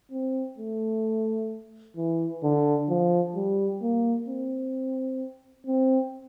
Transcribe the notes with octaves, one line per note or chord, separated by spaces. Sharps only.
C4
A3
E3
D3
F3
G3
A#3
C4
C4